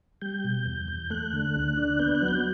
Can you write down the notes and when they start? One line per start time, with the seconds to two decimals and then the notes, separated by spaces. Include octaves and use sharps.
0.22 G3 G6
0.44 B2
0.66 E2
0.88 E2
1.10 A3 F#6
1.33 D3
1.55 D2
1.77 D4
1.99 B3 G6
2.15 F#6
2.22 F#3
2.28 G6